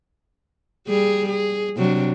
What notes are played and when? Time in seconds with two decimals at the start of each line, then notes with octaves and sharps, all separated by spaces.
0.88 G3 G#4
1.29 G#4
1.77 C3 F#3 D4